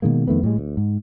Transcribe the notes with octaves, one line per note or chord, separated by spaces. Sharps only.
B2 D#3 G#3 A#3
F2 D#3 A3 B3
A2 G3 G#3
D2
G#2